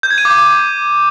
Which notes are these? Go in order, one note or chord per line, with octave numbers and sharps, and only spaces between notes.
G6
G#6
D#7
D6